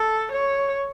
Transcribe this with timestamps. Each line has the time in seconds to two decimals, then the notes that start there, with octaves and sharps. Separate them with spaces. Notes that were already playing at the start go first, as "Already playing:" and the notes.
Already playing: A4
0.32 C#5